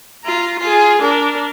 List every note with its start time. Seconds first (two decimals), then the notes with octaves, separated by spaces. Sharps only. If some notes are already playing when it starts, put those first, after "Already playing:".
0.24 F4 A#5
0.59 F4 G#4
1.02 D4 A#4